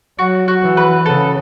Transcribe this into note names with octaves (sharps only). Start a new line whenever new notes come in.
F#3 F#4
F#4
E3
B4
C#3 A4